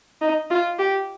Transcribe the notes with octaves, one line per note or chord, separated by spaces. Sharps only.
D#4
F4
G4